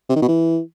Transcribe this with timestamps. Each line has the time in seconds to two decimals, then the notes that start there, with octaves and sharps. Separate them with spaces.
0.09 C3
0.16 D#3
0.22 B2
0.28 E3